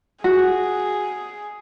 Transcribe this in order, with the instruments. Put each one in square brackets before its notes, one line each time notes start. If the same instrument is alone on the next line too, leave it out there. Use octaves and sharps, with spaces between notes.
[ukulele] F#4 [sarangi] G#4